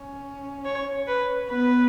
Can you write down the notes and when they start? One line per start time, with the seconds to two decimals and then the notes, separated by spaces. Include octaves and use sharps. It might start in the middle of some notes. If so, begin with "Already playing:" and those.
Already playing: C#4
0.65 C#5
1.08 B4
1.50 B3 B4